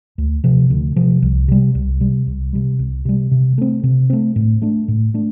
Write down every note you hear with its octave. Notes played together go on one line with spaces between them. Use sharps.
D2
C3 F3
D2
C3 F3
C2
C3 G3
C2
C3 G3
C2
C3 G3
C2
C3 G3
C3
A3 C4
C3
A3 C4
A2
A3 D4
A2
A3 D4